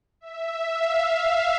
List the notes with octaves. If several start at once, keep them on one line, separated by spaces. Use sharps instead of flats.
E5
F5